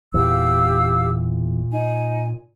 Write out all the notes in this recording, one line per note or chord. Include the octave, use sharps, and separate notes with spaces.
E1 E2 A#2 G4 F5 E6
D#4 G#5